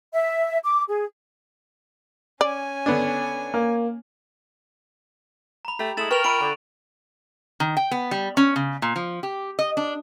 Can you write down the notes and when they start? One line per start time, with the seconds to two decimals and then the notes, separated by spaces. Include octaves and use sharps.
0.13 E5
0.65 D6
0.88 G#4
2.41 C#4 D5 G#5
2.86 D3 B3 D4
3.54 A#3
5.65 A#5 B5
5.79 A3 G4
5.97 G#3 A3 E4 A6 E7 F#7
6.11 A#4 B4 G5 C#6 F7
6.24 F4 E5 B5 D7 D#7
6.41 D3
7.60 D#3
7.77 G5
7.91 B3
8.11 G3
8.37 C#4
8.56 C#3
8.82 A#2
8.96 F3
9.23 G4
9.59 D#5
9.77 D4